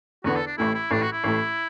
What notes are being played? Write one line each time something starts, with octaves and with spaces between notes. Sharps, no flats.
E2 D3 B3 F#4
A4
D4
A1 A2 A3 E4
E4
A1 A2 A3 D4
F#4
E4
A1 A2 A3